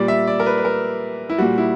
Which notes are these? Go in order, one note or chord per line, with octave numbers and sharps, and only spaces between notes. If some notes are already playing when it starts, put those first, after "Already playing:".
Already playing: A#2 G3 D5
E5
D5
A#4
B4
B4
A#4
E4
A#2 G3 F#4
E4